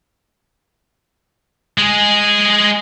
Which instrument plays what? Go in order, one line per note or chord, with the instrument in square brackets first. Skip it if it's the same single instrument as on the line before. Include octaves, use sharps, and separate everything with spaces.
[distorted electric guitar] G#3 G#4